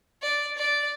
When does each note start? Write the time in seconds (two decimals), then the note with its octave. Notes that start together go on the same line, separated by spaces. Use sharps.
0.22 D5
0.57 D5